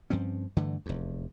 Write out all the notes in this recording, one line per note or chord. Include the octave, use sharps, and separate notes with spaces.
G2 F3 C4 C#4
G2 D3 E3 A3
F1 E2